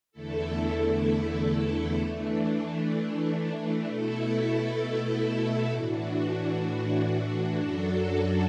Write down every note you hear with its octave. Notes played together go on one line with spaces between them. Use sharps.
E2 D3 A3 E4 A4
E3 A3 D4
B2 A3 E4 A4
A2 E3 D4 F#4
F#2 F#3 D4 F#4 A4